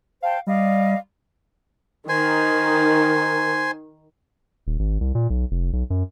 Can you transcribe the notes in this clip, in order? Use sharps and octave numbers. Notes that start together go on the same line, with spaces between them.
C5 F5 G5 A5
G3 D5 D#5 F5
D#3 C5 G#5
D#1
G#1
C2
A#2
B1
F1
B1
F#2